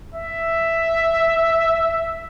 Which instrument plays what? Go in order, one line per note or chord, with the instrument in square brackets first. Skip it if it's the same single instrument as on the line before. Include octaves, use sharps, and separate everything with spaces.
[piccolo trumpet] E5